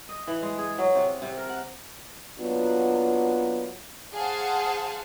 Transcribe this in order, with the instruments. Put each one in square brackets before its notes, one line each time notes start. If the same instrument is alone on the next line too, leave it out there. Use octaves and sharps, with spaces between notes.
[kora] D#5
E3
G#3
G#4
F#3
C3
C3
A#4
F#5
[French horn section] F#3 A#3 B3 D4 F4 F#4
[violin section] G#4 C5 F5 F#5 A5